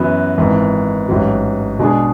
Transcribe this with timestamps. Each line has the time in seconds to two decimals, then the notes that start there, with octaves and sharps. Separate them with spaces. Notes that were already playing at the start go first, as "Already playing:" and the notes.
Already playing: F#2 E3 B3 F#4 B4
0.38 G#1 G#2 E3
1.08 A1 G#2 F#3
1.79 B2 G#3 D4 G#4